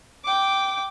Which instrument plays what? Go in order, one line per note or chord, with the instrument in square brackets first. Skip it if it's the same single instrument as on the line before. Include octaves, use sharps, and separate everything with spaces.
[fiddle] G5 D6